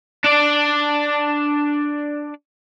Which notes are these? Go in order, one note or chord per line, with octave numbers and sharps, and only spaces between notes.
D4 D5